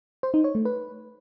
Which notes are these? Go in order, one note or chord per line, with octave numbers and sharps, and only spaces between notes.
C5
D#4
C#5
A3
B4